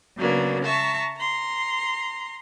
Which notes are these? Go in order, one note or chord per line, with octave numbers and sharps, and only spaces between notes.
C#3 F#3 A#3 B3 D4
E5 A5 A#5 C#6
A#5 C6